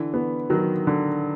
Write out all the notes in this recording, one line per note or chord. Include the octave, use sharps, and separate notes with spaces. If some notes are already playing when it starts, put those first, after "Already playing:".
Already playing: D3 E3
E3 B3
D#3 F#3
D3